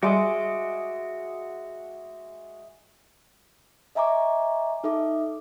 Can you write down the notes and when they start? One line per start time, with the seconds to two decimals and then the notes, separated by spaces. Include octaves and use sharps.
0.03 G3 G#3 F#4 D#5 E5 D6
3.95 D#5 E5 G#5 A#5 C#6 D6
4.84 D#4 A4 E5 D6